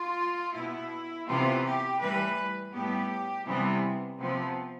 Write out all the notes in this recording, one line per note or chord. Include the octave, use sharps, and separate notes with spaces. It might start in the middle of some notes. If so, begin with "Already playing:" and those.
Already playing: F4
B2 B3 E4
C3 E3 B3 F4
G4
A2 E3 G3 B4
A2 G3 B3 G4
C3 E3 G3 B3
C3 F3 B3